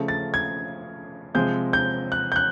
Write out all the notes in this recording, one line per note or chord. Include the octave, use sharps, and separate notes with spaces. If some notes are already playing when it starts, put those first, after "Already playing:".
Already playing: C#3 F3 A3
A6
G#6
C3 F3 G#3 C4 G6
G6
F#6
G6
F#6